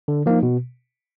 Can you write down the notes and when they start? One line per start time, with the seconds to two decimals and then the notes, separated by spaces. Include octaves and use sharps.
0.08 D3
0.26 F3 A#3 D#4
0.43 B2